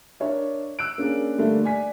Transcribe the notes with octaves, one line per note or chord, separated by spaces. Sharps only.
D4 A#4 C#5 E5
E6 F#6 D7
A#3 C#4 D4 G#4 A#4
D3 G3 A3 A#3 D4
D5 G#5 B6